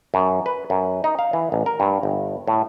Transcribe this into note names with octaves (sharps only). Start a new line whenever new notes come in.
F#2
B4
F#2
D#4
F5
E3
A1
A#4
G2
G1
A2